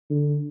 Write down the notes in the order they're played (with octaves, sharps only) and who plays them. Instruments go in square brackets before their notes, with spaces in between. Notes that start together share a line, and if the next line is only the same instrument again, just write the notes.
[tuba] D3